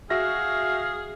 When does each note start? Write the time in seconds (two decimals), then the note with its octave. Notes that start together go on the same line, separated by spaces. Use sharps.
0.10 F#4 G#4 E5 F5 A#6